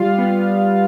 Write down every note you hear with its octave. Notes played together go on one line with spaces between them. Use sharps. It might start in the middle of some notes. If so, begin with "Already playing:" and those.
Already playing: G3 F4 F5
B3